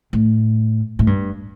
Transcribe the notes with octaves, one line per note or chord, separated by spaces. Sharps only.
A2
A2
G2